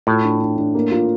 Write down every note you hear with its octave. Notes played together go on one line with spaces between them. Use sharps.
A2 F4
D4
D4
D4
A#3
F4